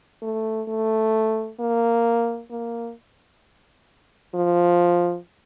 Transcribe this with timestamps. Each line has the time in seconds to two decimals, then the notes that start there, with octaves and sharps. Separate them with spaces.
0.22 A3
0.68 A3
1.60 A#3
2.51 A#3
4.35 F3